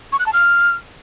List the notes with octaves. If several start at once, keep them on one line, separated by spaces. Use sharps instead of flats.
C#6
F#6
A5
F6